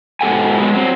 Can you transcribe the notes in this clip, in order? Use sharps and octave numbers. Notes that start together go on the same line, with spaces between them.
G#2 B2 G4 A4 F#5 G#5
F#3 G#3 B3
F#3 C4